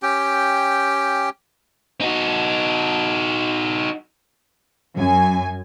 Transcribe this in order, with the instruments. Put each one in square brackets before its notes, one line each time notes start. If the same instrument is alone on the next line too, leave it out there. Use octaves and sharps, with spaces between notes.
[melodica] C#4 G4 G5
[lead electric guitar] D#4 F#4
[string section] F#2 G#5